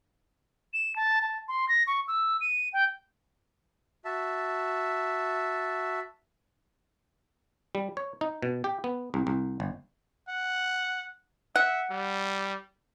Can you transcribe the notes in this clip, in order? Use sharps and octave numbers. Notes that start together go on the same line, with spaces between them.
E7
A5
A5
C6
A#6
C#6
E6
D#7
G5
F#4 E5 A5
G3
C#5
D#4
B2
G4
B3
C2
C2
G1
F#5
E5 F#5
G3